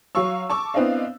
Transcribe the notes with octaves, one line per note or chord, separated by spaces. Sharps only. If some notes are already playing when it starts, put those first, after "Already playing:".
F#3 F5 C#6 E6
A5 C#6 D6 E6
B3 C4 D4 E4 D#5 F5